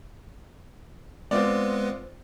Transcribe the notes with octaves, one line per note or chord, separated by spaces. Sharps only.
G#3 B3 C4 F4 B4 D5